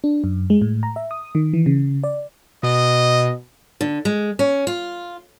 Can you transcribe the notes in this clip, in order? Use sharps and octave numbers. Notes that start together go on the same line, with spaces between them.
D4
F#2
G#3
A2
A#5
E5
D#6
D#3
E3
C#3
D5
B2 D#5
D3
G#3
C#4
F4